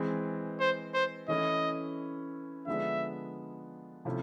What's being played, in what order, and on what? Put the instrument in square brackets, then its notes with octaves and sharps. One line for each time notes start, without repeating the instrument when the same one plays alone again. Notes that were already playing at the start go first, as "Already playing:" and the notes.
Already playing: [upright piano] E3 G#3 C4
[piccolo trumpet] C5
C5
[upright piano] E3 A3 C#4 E4 [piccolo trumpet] D#5
[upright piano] D3 F3 G#3 B3 D4 [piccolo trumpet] E5
[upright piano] C3 F3 A3 C#4 E4